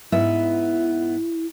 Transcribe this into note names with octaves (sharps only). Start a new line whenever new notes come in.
G#2 B3 E4 E5